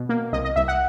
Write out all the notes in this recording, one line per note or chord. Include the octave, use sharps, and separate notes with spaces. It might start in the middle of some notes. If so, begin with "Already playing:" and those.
Already playing: B2
A#3
C2 D#5
D#5
C2 E5
F#5